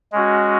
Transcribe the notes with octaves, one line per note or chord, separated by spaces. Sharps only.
G#3 C#4 F#4